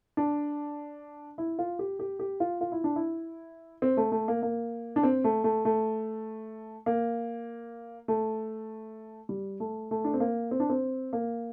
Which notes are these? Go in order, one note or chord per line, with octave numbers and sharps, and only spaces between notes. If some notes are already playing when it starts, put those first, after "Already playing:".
D4
E4
F4
G4
G4
G4
F4
F4
E4
D4
E4
C4
A3
A3
A#3
A#3
D4
C4
A3
A3
A3
A#3
A3
G3
A3
A3
D4
C4
A#3
C4
D4
C4
A#3